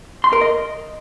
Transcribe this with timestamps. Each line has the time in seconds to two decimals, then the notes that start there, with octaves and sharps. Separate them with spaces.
0.24 C6
0.33 A#4
0.41 D#5